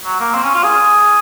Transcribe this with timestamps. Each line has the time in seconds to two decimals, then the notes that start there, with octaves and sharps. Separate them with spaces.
0.05 F#3
0.20 A#3
0.35 C4
0.44 C#4
0.55 F4
0.64 G#4